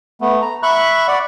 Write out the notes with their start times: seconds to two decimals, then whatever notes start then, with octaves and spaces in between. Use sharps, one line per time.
0.21 A3 B3
0.42 A#5
0.63 E5 B5 C#6 F#6
1.08 D5 F#5